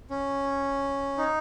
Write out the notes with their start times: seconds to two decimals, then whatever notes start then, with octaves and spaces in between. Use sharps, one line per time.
0.10 C#4
1.18 D#4